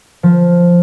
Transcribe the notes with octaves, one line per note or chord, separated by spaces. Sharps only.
F3